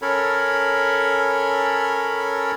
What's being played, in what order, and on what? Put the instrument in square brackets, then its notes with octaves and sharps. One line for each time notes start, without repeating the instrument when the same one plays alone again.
[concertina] C#4 A4 A#4 C#5 B5